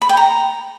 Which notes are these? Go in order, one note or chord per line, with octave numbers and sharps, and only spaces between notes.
B5
G5
A#5